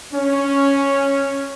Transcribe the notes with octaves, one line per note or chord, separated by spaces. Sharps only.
C#4